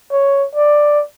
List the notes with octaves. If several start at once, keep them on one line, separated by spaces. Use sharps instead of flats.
C#5
D5